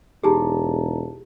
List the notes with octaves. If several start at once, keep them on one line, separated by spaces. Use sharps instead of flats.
E1 D#4 G4 G#4 A5 A#5